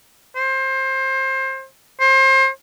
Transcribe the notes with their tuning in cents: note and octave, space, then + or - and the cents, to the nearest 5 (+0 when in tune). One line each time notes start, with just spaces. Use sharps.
C5 +25
C5 +30